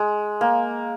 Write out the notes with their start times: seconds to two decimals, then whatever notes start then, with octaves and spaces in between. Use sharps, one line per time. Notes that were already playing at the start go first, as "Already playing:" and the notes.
Already playing: G#3
0.41 A#3